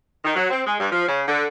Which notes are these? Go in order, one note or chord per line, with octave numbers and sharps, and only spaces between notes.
D#3
F#3
C4
G#3
G2
F3
C#3
D3